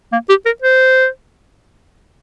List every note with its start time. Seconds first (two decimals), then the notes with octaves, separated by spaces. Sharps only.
0.12 A#3
0.29 G4
0.46 A#4
0.62 C5